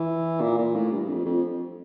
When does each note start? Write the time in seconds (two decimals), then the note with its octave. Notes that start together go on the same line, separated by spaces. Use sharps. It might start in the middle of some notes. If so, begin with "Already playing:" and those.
Already playing: E3
0.41 A#2
0.58 A#2
0.75 A2
0.92 G2
1.08 F2
1.25 F2